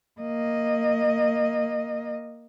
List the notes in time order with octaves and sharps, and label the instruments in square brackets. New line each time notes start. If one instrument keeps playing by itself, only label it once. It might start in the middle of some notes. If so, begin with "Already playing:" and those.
[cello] A#3 D#5